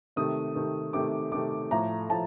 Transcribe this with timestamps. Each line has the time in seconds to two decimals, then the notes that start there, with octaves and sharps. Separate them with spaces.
0.16 C3 D#3 A3 D#6
0.55 C3 D#3 A3
0.93 C3 D#3 A3 D6
1.32 C3 D#3 A3 D6
1.71 A2 F3 A3 A#5
2.10 A2 F3 A5